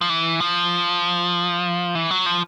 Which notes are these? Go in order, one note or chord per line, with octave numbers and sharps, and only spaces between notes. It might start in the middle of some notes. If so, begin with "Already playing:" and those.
F3
E3
F3
E3
F#3
F3